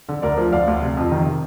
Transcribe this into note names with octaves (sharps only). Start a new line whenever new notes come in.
D3
D2 A#4 D5
F3
D2 D5 F5
D2
C3
F2
D#3
C3